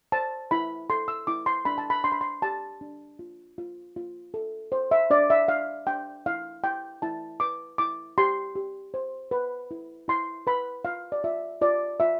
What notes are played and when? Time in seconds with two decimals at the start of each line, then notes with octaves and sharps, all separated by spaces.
0.12 C5 A5
0.51 E4 B5
0.90 A4 C6
1.08 E6
1.27 E4 D6
1.46 C6
1.65 D4 B5
1.78 A5
1.90 B5
2.04 D4 C6
2.12 B5
2.21 C6
2.42 G4 A5
2.81 D4
3.19 F4
3.58 F4
3.96 F4
4.34 A4
4.72 C5
4.91 E5
5.10 D4 D5
5.30 E5
5.48 D4 F5
5.87 D4 G5
6.26 E4 F5
6.64 E4 G5
7.02 E4 A5
7.40 B4 D6
7.78 E4 D6
8.18 G4 C6
8.55 G4
8.94 C5
9.31 B4
9.71 E4
10.08 E4 C6
10.47 B4 B5
10.85 F4 F5
11.12 D5
11.24 F4 E5
11.61 F4 D5
12.00 F4 E5